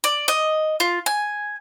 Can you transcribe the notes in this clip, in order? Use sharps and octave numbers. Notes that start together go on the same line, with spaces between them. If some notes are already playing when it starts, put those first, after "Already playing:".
D5
D#5
F4
G#5